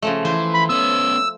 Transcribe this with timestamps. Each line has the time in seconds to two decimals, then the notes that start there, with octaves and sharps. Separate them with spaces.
0.02 C#3 F3 A3
0.25 E3 C5
0.54 B5
0.69 B3 C#4 E6